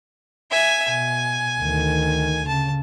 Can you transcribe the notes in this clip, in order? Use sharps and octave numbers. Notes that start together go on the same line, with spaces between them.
E5 G#5
B2 G#5
D2 D#3
C#3 A5